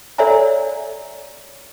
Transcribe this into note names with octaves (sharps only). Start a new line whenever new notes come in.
A4 C#5 D5 E5 G#5 A#5